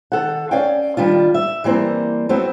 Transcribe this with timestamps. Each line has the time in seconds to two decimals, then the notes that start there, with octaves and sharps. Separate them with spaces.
0.12 D#3 A4 F#5
0.51 C#4 D5 F5 G5
0.97 D#3 G3 D4 F4
1.34 E5
1.64 E3 G3 A#3 C4
2.29 F#3 A3 B3 C4